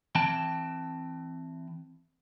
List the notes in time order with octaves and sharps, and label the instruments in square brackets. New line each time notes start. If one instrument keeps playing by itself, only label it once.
[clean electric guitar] E3 C4 G5 A5